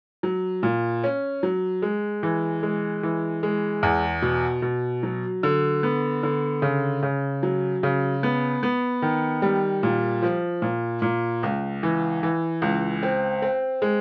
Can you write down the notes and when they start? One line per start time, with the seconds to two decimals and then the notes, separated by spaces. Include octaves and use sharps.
0.23 F#3
0.63 A#2
1.04 C#4
1.43 F#3
1.82 G#3
2.23 E3
2.63 G#3
3.03 E3
3.43 G#3
3.83 E2
4.22 B2
4.62 B2
5.03 F#3
5.43 D3
5.83 B3
6.23 D3
6.62 C#3
7.03 C#3
7.43 F#3
7.83 C#3
8.23 B3
8.63 B3
9.02 D#3
9.42 G3
9.83 A#2
10.22 F3
10.62 A#2
11.02 A#2
11.43 C#2
11.83 E3
12.23 E3
12.62 C#2
13.03 C4
13.42 C4
13.82 G#3